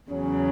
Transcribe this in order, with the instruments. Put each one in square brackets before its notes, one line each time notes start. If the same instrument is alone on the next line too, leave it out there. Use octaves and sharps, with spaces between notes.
[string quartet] E2 C#3 F#3 [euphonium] C#4